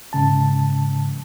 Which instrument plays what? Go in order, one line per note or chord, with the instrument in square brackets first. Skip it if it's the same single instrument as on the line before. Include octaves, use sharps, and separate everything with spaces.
[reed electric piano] G#2 C#3 A5